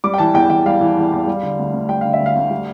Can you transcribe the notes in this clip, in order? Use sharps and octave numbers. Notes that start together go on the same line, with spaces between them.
G3 D6
G5
E3 A5
E2 G5
E2 G5
G3 F5
E3
E2
E2
G3
D3
D2
D2
G3 G5
D3 F5
E5
D2
F5
D2
G3